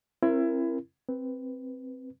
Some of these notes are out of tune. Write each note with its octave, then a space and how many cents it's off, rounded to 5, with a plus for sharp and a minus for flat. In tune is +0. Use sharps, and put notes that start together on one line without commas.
C4 +35 E4 +25 A#4 +0
C4 +0 B4 +0